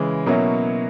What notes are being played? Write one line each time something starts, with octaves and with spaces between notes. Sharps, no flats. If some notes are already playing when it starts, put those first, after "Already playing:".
Already playing: C#3 E3 G#3
B2 F#3 A#3 C#4 E4